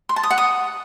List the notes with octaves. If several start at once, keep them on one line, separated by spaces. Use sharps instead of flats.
C6
A5
D#6
F#5
D#6